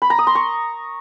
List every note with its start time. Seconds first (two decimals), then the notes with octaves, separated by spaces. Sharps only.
0.02 B5
0.10 A#5
0.18 D#6
0.27 C6
0.35 C#6